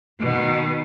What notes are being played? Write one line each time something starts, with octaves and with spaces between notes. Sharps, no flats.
B2 D#3